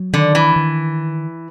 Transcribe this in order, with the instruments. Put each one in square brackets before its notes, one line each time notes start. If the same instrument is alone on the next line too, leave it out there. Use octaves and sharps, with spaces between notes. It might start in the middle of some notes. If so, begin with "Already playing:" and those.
Already playing: [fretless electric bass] F#3
[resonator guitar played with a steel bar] D3 [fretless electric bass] D#3
[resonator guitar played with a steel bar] E3
[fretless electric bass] D#3